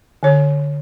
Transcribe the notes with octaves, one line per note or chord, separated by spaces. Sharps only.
D3 C#5